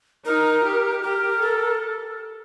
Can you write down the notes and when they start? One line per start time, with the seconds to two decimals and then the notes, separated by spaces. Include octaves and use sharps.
0.25 D#4 A#4
0.64 G4
1.02 G4 A#4
1.41 A4